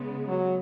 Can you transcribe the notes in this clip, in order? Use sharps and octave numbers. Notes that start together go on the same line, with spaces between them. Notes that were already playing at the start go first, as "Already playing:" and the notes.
Already playing: C#3 G#3 B3
F#3